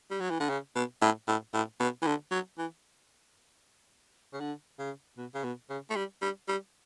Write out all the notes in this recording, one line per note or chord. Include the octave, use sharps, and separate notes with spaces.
G3
F#3
E3
D3
C#3
B2
A2
A2
A2
B2
E3
D3
F#3
E3
C#3
D3
C#3
B2
C#3
B2
C#3
A3
G3
G3
G3